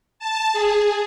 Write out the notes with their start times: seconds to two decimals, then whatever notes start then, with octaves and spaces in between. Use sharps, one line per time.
0.19 A5
0.53 G#4